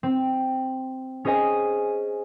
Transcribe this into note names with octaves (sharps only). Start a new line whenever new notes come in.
C4
C#4 G#4 C5 D#5 G#5